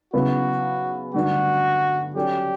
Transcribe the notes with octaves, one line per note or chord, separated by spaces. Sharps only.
C#3 F#3 B3 E4 F#4 B4
G2 D3 F#3 A3 F#4
F#3 C#4 F#4 G4 A4 D5